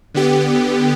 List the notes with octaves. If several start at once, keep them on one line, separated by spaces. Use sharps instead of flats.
D3 B3 G4